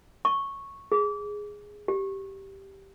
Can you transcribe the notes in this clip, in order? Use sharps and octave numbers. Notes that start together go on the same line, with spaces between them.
C#6
G#4
G4